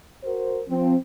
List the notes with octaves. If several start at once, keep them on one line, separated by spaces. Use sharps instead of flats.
F#4 A#4 C5
F3 C4